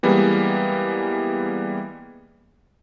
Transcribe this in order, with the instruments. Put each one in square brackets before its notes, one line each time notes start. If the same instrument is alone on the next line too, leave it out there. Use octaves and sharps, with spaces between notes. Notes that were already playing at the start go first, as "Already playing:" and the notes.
[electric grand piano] E3 G3 G#3 A#3 B3